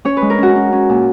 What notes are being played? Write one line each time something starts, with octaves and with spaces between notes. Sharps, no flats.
C#4 C#5
B4
G#3
A#4
C#4 F#4
C#4
C#4
A#2